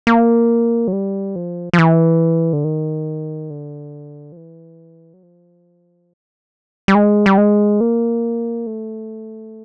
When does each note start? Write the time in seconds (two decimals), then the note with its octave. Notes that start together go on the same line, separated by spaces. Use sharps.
0.07 A#3
0.88 F#3
0.93 G3
1.36 F3
1.73 F3
1.78 E3
2.53 D3
2.64 D#3
3.50 D3
4.32 F3
4.37 E3
5.14 F#3
5.23 F3
6.88 G3
6.95 G#3
7.26 G3
7.38 G#3
7.81 A#3
8.67 A3